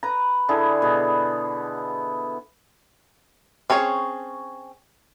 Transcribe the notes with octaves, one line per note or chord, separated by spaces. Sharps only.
B4 A#5
D3 E4 G#4
B2 G#4
C4 C#4 G#4 C#5